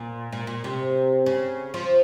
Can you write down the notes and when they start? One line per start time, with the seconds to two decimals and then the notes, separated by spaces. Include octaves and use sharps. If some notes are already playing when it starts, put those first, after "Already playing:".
Already playing: A#2
0.32 A#2
0.47 A#2
0.64 C3
1.26 C#3
1.74 F3